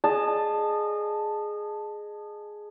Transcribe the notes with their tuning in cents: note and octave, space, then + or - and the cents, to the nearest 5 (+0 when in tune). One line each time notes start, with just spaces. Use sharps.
G#4 +10 D#5 -25 A5 +0